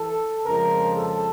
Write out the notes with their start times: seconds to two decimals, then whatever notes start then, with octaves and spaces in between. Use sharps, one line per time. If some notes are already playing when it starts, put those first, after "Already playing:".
Already playing: E3 A4
0.46 F2 C#3 F3 G#3 A#4
0.99 A4